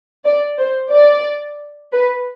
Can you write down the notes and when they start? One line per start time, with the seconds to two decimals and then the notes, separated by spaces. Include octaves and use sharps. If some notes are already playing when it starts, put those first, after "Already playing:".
0.25 D5
0.58 C5
0.91 D5
1.93 B4